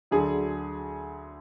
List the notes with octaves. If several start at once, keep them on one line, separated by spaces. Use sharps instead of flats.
D2 D3 F#3 G#4